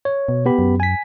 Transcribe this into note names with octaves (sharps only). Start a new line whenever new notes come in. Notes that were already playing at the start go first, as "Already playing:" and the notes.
C#5
B2
B3 G4 B5
F#2
G#5 B6